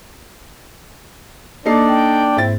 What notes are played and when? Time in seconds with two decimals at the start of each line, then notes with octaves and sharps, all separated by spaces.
1.66 A#3 D4 D#4 A4 D5 C7
1.88 G5
2.37 G#2 C4 E4 A6